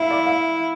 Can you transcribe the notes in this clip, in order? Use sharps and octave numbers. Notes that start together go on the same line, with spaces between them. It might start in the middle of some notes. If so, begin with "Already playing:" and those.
Already playing: E4 E5 F5
D5
F5